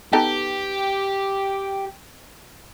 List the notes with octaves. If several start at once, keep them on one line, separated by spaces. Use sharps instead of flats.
B3 D#4 G4 A4